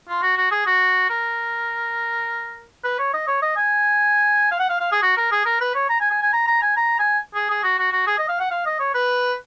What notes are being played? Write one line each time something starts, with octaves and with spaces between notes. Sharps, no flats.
F4
F#4
F#4
G#4
F#4
A#4
B4
C#5
D#5
C#5
D#5
G#5
F5
F#5
F5
F5
G#4
F#4
A#4
G#4
A#4
B4
C#5
A#5
G#5
G#5
G#5
A#5
A#5
G#5
A#5
G#5
G#4
G#4
F#4
F#4
F#4
G#4
D#5
F5
F#5
F5
D#5
C#5
B4